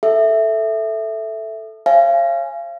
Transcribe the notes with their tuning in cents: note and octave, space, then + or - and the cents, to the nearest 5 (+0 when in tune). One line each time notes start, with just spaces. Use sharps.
A4 +0 E5 +0
C#5 -30 F5 -35 G#5 +0